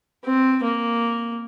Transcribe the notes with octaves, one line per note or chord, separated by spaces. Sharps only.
C4
A#3